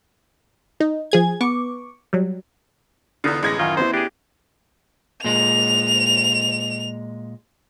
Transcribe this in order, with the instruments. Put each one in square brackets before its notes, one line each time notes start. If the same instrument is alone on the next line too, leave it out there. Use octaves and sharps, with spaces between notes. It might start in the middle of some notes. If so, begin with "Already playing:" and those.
[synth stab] D#4
F3 G#4 G#6
B3 C#6 D6
F#3 G3
[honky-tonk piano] E2 D3 [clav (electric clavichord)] B3 D#4 F4
[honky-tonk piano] A1 G#6 A#6 [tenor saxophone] G#3
[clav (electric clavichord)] F#2 D#3 [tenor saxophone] F4
[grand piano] B3 E4 [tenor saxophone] C5
[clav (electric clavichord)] D4 G#4 [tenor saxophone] G4
[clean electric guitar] A#2 G#3 [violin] F7